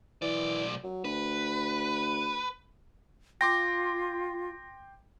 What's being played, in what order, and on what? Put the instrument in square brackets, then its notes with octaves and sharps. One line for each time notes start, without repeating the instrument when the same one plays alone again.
[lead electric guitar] B1 D5 [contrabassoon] E3
[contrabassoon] F#3
[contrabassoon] D2 [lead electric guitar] B4
[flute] F4 [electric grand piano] G5 C6 D6 [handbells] A#6